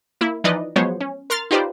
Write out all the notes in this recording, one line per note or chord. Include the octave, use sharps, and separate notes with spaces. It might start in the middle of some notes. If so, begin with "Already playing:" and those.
A#3 E4
E3 F3 D#4 B4 D5 D#5
F3 F#3 G#3 B3 C5 C#5
C#4
A#4 C6 F6 A6
D#4 F4 G4 B4 C5 D5